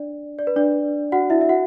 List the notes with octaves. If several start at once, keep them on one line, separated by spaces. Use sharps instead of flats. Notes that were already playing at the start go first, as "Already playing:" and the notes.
Already playing: D4 D5
D5
B4
D4 D5
F#4 F#5
E4 E5
E5
F#4 F#5